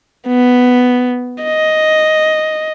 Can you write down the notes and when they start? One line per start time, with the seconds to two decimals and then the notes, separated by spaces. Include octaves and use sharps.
0.27 B3
1.44 D#5